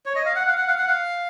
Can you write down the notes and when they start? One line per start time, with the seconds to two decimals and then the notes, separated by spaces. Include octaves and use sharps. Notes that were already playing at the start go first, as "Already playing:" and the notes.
0.06 C#5
0.16 D#5
0.25 F5
0.36 F#5
0.47 F5
0.57 F#5
0.67 F5
0.78 F#5
0.87 F5